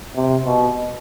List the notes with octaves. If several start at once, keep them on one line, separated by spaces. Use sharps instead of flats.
C3
B2